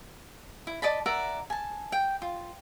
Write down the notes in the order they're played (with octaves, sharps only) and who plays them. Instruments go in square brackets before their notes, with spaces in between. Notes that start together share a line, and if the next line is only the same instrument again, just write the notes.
[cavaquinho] E4
D5 D#5 A5 B5
A#4 D5 E5 F#5
G#5 A5
G5
F4